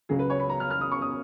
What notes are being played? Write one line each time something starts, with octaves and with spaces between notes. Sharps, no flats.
C#2 C#3 F#3 C#4 G#4
B4
C#5
B5
A#5
F6
F6
D#6
C#6
D#6